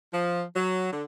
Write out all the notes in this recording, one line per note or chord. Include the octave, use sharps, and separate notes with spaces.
F3
F#3
D3